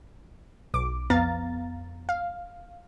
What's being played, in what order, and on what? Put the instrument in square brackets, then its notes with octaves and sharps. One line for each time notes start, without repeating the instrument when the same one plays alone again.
[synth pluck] B1 D6
F2 B3 F5 A#5 A6
F5